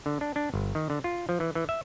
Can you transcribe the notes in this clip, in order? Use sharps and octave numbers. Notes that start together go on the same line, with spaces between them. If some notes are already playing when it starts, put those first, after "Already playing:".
D3
D4
D4
G1
D#3
D3
F4
F3
E3
E3
E5